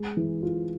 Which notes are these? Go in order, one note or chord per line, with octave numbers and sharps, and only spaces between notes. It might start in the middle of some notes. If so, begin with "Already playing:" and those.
Already playing: G#3
E3
F4